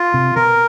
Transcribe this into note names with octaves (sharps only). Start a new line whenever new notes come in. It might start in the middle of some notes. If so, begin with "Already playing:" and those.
Already playing: F4
C3
B2 A#4